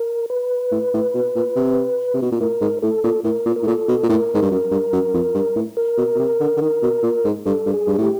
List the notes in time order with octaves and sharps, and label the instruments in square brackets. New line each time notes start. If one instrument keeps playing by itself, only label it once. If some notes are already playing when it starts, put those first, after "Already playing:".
Already playing: [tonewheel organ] A#4
B4
[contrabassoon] A2
A2
B2
A#2
C3
C3
B2
A#2
[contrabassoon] A2 [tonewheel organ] A#4
[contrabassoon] G#2
[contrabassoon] A2 [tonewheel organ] A4
[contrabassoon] A#2
[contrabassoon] A2 [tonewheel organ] A#4
[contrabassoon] A#2
[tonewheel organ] A#4
[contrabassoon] A2
[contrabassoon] A#2 [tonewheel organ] A4
[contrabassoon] B2
A#2
[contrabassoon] A2 [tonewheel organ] A#4
[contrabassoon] G#2
G2
F#2
G2
F#2
F2
G2
A2
[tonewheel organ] A#4
[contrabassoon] B2
B2
C3
D3
D3
D#3
B2
A#2
G#2
[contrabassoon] G2 [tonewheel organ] A4
[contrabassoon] G2
[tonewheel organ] G#4
[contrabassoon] G2
[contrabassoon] A2 [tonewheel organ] G4